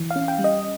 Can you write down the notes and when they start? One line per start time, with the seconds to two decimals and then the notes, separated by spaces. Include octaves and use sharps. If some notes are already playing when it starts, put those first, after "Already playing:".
Already playing: E3
0.11 F5
0.16 C#4
0.28 G5
0.39 G3
0.44 D#5